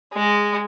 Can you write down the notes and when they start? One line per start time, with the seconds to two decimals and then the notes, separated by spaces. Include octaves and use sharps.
0.13 G#3